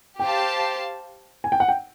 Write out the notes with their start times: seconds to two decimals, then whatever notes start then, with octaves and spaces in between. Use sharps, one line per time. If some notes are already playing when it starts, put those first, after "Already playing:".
0.19 G4 C5 F5 G5 A5
1.44 G#5
1.52 G5
1.60 F#5
1.69 G5